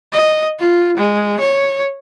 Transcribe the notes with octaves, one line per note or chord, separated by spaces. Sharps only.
D#5
F4
G#3
C#5